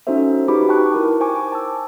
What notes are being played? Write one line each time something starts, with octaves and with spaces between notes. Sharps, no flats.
C#4 D#4 F#4 A4 C5 E5
D#4 F#4 G4 B4 B5 D6
G5 A5 C#6 F#6
E4 A#4 G5
C5 G5 G#5 C#6 D6
A5 E6